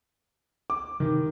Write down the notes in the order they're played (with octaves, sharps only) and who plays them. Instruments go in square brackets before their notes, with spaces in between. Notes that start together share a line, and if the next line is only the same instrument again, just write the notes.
[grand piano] D6
[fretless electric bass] C3 E3 [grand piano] D#3